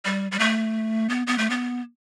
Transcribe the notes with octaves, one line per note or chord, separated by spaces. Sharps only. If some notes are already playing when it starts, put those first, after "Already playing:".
G3
G3
A3
B3
B3
A3
B3